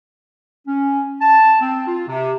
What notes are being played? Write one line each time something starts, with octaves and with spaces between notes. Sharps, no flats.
C#4
A5
C4
F4
C3